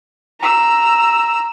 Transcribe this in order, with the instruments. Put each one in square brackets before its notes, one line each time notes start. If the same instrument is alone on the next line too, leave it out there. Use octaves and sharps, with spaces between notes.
[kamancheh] A#5 E6